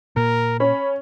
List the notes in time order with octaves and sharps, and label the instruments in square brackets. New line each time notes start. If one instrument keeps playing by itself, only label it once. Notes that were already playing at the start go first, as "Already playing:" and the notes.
[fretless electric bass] A#2 [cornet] A#4
[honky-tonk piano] C#4 [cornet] B5